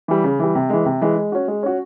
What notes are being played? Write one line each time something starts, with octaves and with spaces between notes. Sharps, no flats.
E3 G3
C#3
E3 G3
C3
E3 G#3
C3
E3 G#3
G#3
C#4 F#4
G#3
C#4 F#4